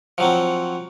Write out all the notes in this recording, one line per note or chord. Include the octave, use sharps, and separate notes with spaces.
F3 F#3 C4